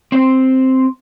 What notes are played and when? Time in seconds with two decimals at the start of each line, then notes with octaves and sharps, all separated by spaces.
0.12 C4 C5